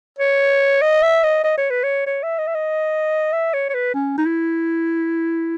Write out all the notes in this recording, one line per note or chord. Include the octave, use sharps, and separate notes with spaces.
C#5
D#5
E5
D#5
D#5
C#5
B4
C#5
C#5
E5
D#5
E5
D#5
E5
C#5
C#5
B4
C#4
D#4
E4